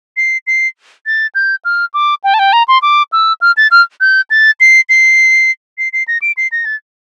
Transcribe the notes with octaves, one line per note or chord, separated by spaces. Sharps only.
C7
C7
A6
G6
F6
D6
G5
A5
G5
A#5
C6
D6
E6
F6
A6
F6
G6
A6
C7
C7
C7
C7
A#6
D7
C7
A#6
A6